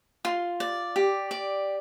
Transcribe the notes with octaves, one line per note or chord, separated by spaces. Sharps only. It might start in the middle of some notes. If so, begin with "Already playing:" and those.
F4 C6
D5
G4
D5